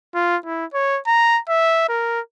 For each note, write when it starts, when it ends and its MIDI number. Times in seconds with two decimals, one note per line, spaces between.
0.14 0.37 65
0.45 0.65 64
0.74 1.00 73
1.07 1.40 82
1.49 1.85 76
1.89 2.20 70